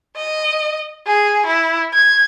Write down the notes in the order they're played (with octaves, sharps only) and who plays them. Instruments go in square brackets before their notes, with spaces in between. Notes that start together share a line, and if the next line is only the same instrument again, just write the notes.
[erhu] D#5
G#4
E4
G#6